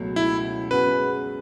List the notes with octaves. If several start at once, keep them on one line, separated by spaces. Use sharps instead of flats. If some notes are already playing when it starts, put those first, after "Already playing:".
Already playing: C#2 B2 F#3 A3
E4
F#2 C#3 G#3 B3 F#4 B4